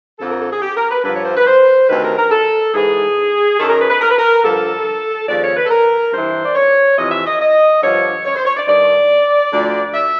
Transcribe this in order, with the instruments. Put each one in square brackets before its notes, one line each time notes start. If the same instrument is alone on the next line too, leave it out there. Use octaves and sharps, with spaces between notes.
[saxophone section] F2 D3 F3 A4
A#4
A4
G#4
G4
A#4
B4
G2 D3 F3 B4
C#5
C5
B4
C5
D2 C3 D#3 B4
A#4
A#4
A4
G#2 E3 G#4
F#2 D#3 A4
A#4
B4
B4
A#4
B4
A#4
G2 D3 F3 A4
D#2 C#3 F3 D5
C#5
B4
A4
A#4
G2 E3 C5
D5
C#5
F2 C3 E3 D#5
E5
D#5
D#5
G2 D3 F3 C#5
C#5
C5
C#5
D5
G2 D#3 D5
D2 D3 F3
E5